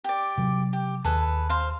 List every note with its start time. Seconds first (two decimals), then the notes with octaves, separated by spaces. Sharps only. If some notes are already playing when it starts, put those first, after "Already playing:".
0.04 G4 D5
0.38 C3 F#3
0.73 G4
1.04 D#2 G#4 A4 B4
1.50 C5 F5